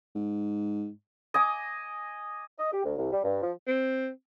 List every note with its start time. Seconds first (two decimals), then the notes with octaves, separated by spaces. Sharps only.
0.15 G#2
1.34 D#5 G#5 D6
2.59 D#5
2.72 G4
2.84 D2
2.97 C2
3.12 G3
3.24 G2
3.42 F3
3.67 C4